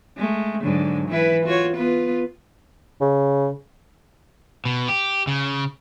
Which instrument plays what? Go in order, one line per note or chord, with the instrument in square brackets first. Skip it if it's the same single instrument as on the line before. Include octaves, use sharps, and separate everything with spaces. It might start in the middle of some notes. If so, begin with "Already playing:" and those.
[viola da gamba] G#3 A3
G#2 D3 F#3
E3 E4 B4
F4 F#4 C#5
B3 F4 B4
[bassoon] C#3
[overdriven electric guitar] B2
G4
C#3